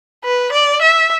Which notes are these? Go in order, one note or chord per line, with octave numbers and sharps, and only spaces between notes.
B4
D5
E5